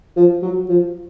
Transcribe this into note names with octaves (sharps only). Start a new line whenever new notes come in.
F3
F#3
F3